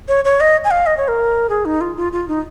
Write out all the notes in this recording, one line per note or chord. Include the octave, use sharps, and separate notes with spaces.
C#5
C#5
D#5
G#5
F5
D#5
C#5
A#4
G#4
D#4
F4
F4
F4
D#4